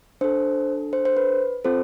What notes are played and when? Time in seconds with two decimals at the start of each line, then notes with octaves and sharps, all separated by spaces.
0.21 D4 A4 C5
0.93 C5
1.05 C5
1.17 B4
1.64 C4 F4 A4 C5